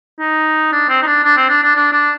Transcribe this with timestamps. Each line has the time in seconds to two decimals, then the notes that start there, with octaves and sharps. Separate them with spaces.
0.19 D#4
0.72 D4
0.89 C4
1.02 D#4
1.06 D4
1.24 D4
1.37 C4
1.49 D4
1.62 D4
1.75 D4
1.92 D4